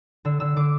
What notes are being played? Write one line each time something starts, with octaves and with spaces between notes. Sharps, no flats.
D3 E6
D3 E6
D3 D6